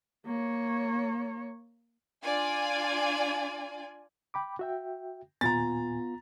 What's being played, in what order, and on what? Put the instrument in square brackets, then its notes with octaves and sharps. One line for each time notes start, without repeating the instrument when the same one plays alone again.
[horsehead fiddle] A#3 C#5
[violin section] D4 F4 D5 G#5
[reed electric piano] G5 B5 D6
F#4 E5 G5
[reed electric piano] D#2 A#2 G#5 [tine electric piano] B3 F4 [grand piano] A#5 A6